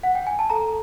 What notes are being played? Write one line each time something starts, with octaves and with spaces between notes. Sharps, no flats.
F#5
G5
G#5
A5
A4 A#5